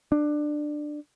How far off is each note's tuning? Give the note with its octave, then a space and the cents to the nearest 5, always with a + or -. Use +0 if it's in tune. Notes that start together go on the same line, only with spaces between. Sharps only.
D4 +20